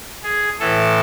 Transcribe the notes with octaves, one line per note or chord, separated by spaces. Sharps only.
G#4
A2 E3 A4